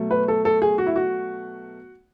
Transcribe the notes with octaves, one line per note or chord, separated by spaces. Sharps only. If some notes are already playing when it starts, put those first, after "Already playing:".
Already playing: B2 F#3 A3
B4
A4
A4
G#4
F#4
E4
F#4